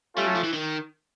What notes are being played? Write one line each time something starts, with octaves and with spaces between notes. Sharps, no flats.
G3 A3 C#4 F4 A4
F#3
F3
E3
D#3